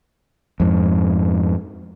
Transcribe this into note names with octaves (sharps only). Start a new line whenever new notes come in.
F2 G#2